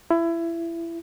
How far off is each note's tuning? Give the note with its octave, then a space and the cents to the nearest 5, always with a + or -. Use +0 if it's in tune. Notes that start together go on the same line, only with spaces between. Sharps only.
E4 +25